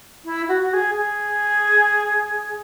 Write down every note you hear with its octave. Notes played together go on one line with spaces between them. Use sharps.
E4
F#4
F#4
G#4
G#4